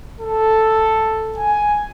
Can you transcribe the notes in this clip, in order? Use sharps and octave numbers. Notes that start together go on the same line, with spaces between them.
A4
G#5